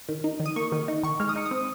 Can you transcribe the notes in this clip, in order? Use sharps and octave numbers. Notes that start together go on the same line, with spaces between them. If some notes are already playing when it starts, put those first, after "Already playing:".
D#3
D#4
D#3
D#6
A#3 C#6
D#3
D#4
D#3 C#6
G#3 F6
D#6
D#4 C#6
D#6
C4